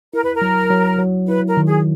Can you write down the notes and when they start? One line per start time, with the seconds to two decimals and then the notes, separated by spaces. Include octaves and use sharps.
0.13 E4 A#4
0.23 B4
0.34 A#4
0.42 F#3
0.70 F#3
0.98 F#3
1.27 E4 B4
1.47 A#4
1.57 D#3
1.66 G#4